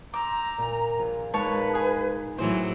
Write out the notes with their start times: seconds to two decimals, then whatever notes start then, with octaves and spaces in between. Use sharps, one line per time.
0.14 A#5 C6 D6 E6 G6
0.58 A#2
0.99 A#1
1.34 G#3 A#3 D#4 B4 C#5 A5
1.75 G#4
2.38 A2 E3 F#3 C5 G#5